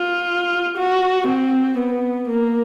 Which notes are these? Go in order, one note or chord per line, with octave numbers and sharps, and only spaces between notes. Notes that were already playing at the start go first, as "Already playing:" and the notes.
Already playing: F4
F#4
C4
B3
A#3